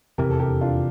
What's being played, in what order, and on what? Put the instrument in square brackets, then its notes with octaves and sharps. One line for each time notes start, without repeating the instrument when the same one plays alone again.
[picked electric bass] F1 E2 C3 E3 [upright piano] G4 A#4
[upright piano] A4
G4 A#4
D4 F4